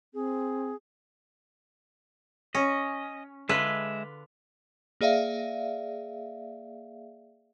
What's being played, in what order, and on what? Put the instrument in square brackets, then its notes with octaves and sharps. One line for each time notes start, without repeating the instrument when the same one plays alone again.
[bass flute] C4 [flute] G#4
[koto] C#4 [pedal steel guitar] D#5
[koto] D3 F4 B4 [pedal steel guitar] G#3 E5
[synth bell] A#3 G#4 D5 E5 F5